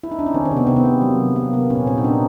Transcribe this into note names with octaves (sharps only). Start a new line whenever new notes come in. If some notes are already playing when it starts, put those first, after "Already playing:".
E4
D#4
D4
C#4
D#3 C4
C4
C3
B3
C3 C4
B3
A#3
F#3
C3
A#3
C3 B3
A#2 C#4
A#2 C4
D#4
A#2 D4